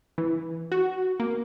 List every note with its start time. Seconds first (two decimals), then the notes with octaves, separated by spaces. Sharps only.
0.18 E3
0.72 F#4
1.20 A#3